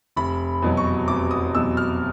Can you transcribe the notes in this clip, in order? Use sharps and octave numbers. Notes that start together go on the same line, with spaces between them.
F1 B5
E2 B2 F#3
C#6
F1 D6
D#6
E2 B2 F#3 E6
F6